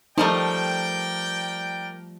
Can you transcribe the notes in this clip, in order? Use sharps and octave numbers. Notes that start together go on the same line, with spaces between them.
F3 G3 A3 D#4 A#4 D5 G5